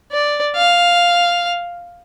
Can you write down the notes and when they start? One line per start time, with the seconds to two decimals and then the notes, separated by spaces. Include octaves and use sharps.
0.12 D5
0.56 F5